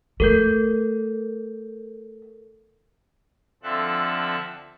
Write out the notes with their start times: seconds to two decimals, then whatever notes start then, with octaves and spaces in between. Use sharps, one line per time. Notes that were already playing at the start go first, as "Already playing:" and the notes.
0.20 A3 A4 A#4 G6
3.63 D3 F3 C4 A4 E5 F#6